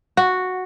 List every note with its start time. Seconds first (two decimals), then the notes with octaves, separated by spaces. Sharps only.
0.17 F#4